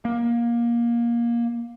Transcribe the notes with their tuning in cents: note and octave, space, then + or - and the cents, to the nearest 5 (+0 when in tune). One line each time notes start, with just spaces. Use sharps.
A#3 +20